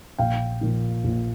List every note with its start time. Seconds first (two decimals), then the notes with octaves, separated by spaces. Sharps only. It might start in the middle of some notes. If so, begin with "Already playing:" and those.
0.18 A#1 F5 G5
0.61 A#2 F3
1.04 A#1